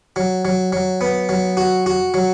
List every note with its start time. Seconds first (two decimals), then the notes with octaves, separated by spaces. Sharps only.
0.16 F#3
0.45 F#3
0.72 F#3
1.01 B3
1.29 F#3
1.57 F#4
1.86 F#4
2.14 F#3